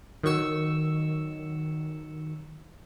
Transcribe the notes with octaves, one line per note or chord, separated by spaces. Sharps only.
D#3 F#3 C#6 E6